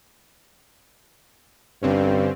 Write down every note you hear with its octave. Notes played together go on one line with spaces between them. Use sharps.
G2 D3 C4 C#4